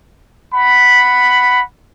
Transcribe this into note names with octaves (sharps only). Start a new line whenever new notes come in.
F#5 B5